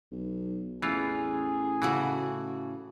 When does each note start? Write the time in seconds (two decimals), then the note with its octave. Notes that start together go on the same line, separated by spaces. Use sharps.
0.11 B1
0.82 A1 E2 E3 F4 G#4
1.82 A2 C#3 E3 F#4